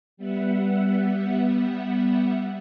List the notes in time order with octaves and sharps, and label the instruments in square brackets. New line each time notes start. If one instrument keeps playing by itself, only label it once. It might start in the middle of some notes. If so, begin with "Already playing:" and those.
[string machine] G3 B3 E5 F#5